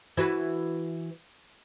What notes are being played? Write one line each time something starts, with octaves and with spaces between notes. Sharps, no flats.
E3 F#4 B4